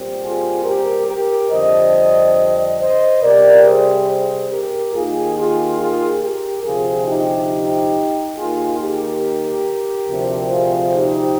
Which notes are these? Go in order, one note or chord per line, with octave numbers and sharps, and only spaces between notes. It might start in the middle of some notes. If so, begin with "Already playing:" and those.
Already playing: A#2 G3 C4
F4 G#4
G4 A#4
G4 A#4
F2 D3 G3 C4 C5 D#5
C5 D#5
C3 G3 C4 A#4 D5
G#4 C5
G#4 C5
G4 A#4
D#2 D#3 A#3 F4 G#4
F4 G#4
F4 G#4
G4 A#4
D2 C3 F3 C4 F4 G#4
D#4 G4
D#2 D#3 A#3 F4 G#4
G4 A#4
D2 C3 F3 C4
F4 G#4
D#4 G4